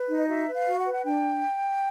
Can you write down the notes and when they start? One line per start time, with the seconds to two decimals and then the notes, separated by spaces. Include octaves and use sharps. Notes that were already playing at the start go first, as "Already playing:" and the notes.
Already playing: B4
0.09 D#4
0.17 D#5
0.28 F#4 E5
0.48 B4
0.54 F5
0.67 F#4
0.79 F#5
0.85 B4
0.94 F#5
1.05 D4 G5